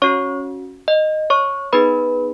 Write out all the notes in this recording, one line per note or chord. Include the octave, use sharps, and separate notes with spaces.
C#4 F#4 C#5 C#6
D#5
C#5 C#6
B3 D#4 G#4 B4 B5